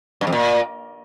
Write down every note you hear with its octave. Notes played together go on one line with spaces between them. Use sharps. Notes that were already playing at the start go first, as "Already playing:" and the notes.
G2
F2
A#2